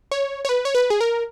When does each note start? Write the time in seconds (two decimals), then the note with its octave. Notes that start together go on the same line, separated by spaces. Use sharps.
0.11 C#5
0.45 C#5
0.49 B4
0.65 C#5
0.75 B4
0.90 G#4
1.01 A#4